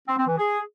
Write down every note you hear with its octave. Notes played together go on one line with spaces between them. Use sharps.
C4
C4
E3
G#4